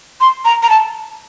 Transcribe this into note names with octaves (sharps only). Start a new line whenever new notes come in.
C6
A#5
A#5
A5